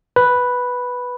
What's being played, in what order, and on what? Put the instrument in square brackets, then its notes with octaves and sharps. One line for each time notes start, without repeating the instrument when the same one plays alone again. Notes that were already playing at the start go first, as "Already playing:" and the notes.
[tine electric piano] B4